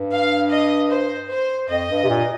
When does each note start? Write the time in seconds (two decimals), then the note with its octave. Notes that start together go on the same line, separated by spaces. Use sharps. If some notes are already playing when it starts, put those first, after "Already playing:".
Already playing: G2
0.13 F5
0.53 D#5
0.92 C5
1.31 C5
1.70 F2 D#5
1.90 G2
2.04 C3
2.09 A#2